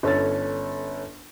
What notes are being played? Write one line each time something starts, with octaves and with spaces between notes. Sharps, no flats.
G1 C#4 A4 C#5 A6